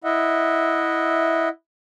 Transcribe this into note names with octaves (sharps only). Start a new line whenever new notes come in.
E4 D#5 E5 F#5